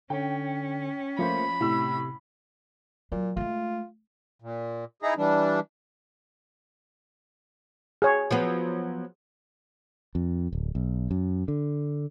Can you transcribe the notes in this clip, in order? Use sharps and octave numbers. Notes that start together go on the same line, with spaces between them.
D3 C#4 C#5 G5
F3 A3 A#3 C5 B5
A2 C3 E6
A#2 F#3
G#3 A3 F4
A#2
D#4 E4 G#4 A#5
E3 G3 D4
G#4 C#5
F3 F#3 B3
F2
D1
B1
F#2
D3